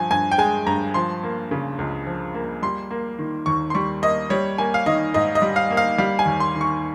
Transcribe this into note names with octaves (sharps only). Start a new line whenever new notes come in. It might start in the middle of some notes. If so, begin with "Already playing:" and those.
Already playing: G2 F3 G#5
G2 G#5
G5
G#3 G#5
G2 A#5
F3 C6
A#3
C#3
C#2
F3
A#3
G3 C6
A#3
D#3
D#2 C#6
C6
G3 C#6
A#3 D#5
G3 C#5
A#3 G#5
F5
D#3 D#5
G#2 D#5
D#5
G3
F5
A#3
F5
G3 F5
G#5
D#2
C6
D#3
C#6